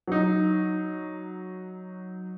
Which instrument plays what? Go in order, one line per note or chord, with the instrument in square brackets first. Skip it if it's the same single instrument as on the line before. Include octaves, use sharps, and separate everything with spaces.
[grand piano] F#3 D#4